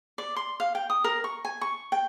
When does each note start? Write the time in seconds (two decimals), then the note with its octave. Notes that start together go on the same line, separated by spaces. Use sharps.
0.18 D5
0.36 C6
0.60 F5
0.75 G5
0.90 D#6
1.04 A#4
1.24 C#6
1.45 G#5
1.61 C#6
1.92 G5